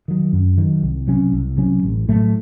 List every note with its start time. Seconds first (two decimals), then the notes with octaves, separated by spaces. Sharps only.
0.08 D#3 F#3
0.33 F#2
0.58 D#3 F#3
0.82 C2
1.07 C3 F#3 C#4
1.32 C2
1.57 C3 F#3 C#4
1.83 A1
2.09 A2 F#3 A3